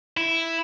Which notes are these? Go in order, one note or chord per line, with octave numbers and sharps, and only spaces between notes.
E4